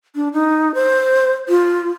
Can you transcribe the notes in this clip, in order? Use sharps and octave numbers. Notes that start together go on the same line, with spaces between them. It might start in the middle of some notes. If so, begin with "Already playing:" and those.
D4
D#4
C5
F4